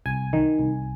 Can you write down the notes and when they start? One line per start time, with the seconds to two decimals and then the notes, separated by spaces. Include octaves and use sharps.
0.06 C2 G#5
0.33 D#3
0.59 C2